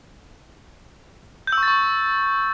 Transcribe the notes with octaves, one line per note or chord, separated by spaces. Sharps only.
G6
E6
C#6
A6
C#6